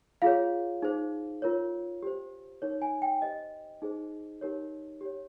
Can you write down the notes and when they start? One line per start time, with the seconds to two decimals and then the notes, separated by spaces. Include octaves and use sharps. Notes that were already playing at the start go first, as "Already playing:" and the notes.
0.22 F4 G#4 C#5 F5
0.82 D#4 G#4 C5
1.42 F4 A#4 C#5
2.03 G4 C5
2.62 D#4 A#4 C#5
2.82 G#5
3.02 G5
3.21 G4 C5 D#5
3.82 D#4 G#4 C5
4.41 D#4 G4 A#4 C#5
5.01 G4 C#5